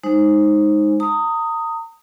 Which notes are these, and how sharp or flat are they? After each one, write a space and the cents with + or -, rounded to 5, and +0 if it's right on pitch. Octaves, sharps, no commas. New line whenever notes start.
G#3 -5 D#4 +0 C5 +20
A#5 -35 D#6 +5